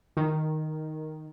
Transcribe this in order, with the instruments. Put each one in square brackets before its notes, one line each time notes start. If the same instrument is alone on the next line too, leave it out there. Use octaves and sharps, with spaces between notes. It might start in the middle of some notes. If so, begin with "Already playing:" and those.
[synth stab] D#3